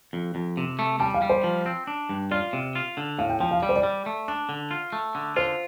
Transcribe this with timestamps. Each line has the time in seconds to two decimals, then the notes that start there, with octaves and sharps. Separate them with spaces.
0.13 F2
0.35 F2
0.57 C3
0.79 A3
1.00 G3 A5
1.14 F5
1.22 G3
1.30 C5
1.44 F3
1.66 C4
1.87 D4
2.09 G2
2.31 F4 D5
2.53 C3
2.75 F4
2.97 D3
3.19 A2 F5
3.30 G5
3.40 F3 G5
3.51 F5
3.62 G3 D5
3.69 C5
3.76 D5
3.83 G3
4.06 A3
4.28 D4
4.49 D3
4.71 F4
4.93 A3
5.15 D3
5.36 F4 C5